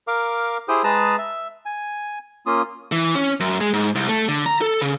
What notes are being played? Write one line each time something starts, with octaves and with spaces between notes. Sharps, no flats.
A#4 F5 D6
E4 G4 G#4 C5 G5 D#6
G#3 G#4 B4 A5 A#5 D#6
E5
G#5
A#3 C#4 F4 D#6
E3
C#4
F#2
G#3
G#2
C2
A3
D3
A#5
A4
C#3